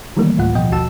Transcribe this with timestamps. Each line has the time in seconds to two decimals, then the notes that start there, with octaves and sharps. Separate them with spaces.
0.17 D#3 E3 G3 A3 A#3
0.38 D2 A2 F4 F#5
0.55 B2 F3 D#5 G5
0.72 A1 D#2 F#4 A5 E6 E7